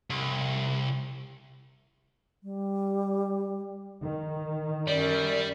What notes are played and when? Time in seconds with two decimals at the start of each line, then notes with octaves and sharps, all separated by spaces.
0.10 C2
2.43 G3
4.02 D#3
4.87 F#2 G3 D5